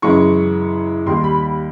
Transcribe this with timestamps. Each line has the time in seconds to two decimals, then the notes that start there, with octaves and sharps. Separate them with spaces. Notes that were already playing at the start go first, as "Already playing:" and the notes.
0.02 F#2 C#3 E3 G#3 C#6
1.06 D#2 D#3 G3 C6
1.24 B5
1.42 B5